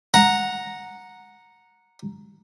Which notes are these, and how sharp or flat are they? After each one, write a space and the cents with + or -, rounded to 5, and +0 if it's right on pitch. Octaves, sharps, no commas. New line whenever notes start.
F#5 -10 A#5 +0